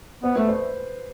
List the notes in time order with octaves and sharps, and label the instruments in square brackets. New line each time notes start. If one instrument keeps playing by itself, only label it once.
[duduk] B3 [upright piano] C5
[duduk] A3 [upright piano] B4
[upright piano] C5